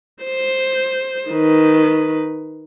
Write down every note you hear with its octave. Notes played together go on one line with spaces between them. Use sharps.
C5
D#3 B4